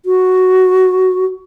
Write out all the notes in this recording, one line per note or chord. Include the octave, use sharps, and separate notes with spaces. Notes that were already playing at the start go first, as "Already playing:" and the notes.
F#4